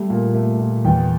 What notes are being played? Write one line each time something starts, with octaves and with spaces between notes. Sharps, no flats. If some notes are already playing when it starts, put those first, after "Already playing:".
Already playing: G3 A3
A#2
A3
A#2
E2 G5